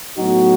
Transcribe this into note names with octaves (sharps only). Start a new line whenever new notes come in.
A2 F#3 B3 D#4 F#4